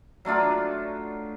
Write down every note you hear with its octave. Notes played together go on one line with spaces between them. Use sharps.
F#3 A3 D4 F4